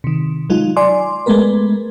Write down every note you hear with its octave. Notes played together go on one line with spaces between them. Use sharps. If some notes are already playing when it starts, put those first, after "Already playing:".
C3 D#3
F#3 G#3 D#4 F4
D5 G#5 C6 D6
G#3 A3 B3 A#4 B4